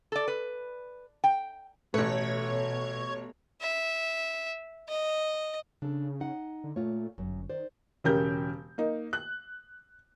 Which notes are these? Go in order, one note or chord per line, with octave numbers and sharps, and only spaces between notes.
A4 D5
B4
G5
A1 B2 A3 B4 C#5
E5
D#5
C#3 D4 A4
D#4 F#5
D3
A#2 A3 F4 C#5
G1 F#2
D#3 C5 D5
E1 C#3 G4 A#4 G6
A#3 D#4
F#6